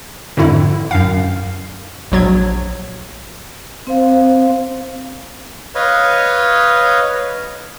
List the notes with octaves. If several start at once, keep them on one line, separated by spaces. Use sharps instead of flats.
F2 G#2 D3 E4
F#2 F5
A#1 F#3 G#6
C4 C5 F5
B4 C#5 D#5 F5